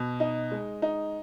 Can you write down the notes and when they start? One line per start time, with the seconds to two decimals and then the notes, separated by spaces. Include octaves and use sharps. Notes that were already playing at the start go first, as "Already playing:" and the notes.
Already playing: B2
0.20 D#4
0.52 G#3
0.82 D#4